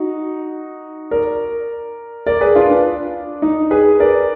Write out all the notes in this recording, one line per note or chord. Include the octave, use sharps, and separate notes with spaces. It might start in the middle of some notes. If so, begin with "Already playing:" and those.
Already playing: D#4 F#4
A#4 D5
A#4 D5
G#4 B4
D4 F4
D4
D#4
G#4 B4
A#4 D5